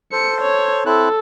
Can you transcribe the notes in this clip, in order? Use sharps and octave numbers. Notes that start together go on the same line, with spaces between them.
A4 C5 C#7
C#5
C4 E4 A4 F#6